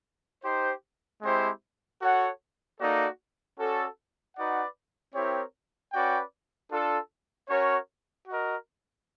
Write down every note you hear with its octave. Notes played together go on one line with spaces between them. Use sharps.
D#4 G4 C5
G#3 C4 E4 G4 C5
F#4 A4 C#5 F#5
A#3 D#4 F#4 A4 D5
C#4 F#4 A4 D5
D#4 F#4 B4 D5 F#5
C4 E4 G4 A#4 C#5
C#4 F#4 B4 D5 G5
D4 F4 A4
C#4 F#4 A#4 C#5
F#4 A#4 D#5